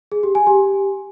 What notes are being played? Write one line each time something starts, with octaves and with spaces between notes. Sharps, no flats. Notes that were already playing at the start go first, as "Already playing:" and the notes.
G#4
G4
G#5
G4